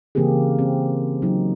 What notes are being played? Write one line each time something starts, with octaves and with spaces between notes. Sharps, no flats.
C#3 E3 A#3 C4 G4 G#4
C4
F#3 D#4